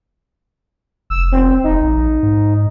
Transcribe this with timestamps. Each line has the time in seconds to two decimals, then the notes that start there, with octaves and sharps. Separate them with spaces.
1.10 F1 E6
1.32 C4
1.64 F1 D#4
1.82 A#1
2.23 G#2